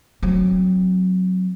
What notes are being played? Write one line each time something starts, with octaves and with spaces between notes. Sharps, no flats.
F#3 C4